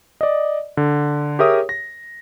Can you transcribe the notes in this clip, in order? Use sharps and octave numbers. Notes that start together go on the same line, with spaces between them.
D5 D#5
D3
G4 G#4 A#4 C#5 E5 D#6
A#6